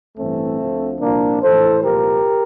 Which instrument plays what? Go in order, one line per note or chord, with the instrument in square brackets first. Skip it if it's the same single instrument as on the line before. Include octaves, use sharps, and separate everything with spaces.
[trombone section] A1 G2 E3 A3 C4
D2 D3 F3
C2 A#2 F3 A#3 D4
A#1 A2 E3 A4 C5
C2 A#2 F3 G4 A#4